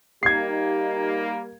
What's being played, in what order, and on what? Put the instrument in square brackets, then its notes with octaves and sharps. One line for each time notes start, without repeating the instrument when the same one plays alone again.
[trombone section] G3 A#3 [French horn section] D#4 G4 [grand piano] G#6 C7